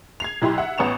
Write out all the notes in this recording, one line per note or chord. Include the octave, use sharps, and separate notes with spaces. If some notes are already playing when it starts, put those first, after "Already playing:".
G#6 C7 F7
B1 E4 G4 C6
E5 F#5
A1 B3 C#6 E7 F7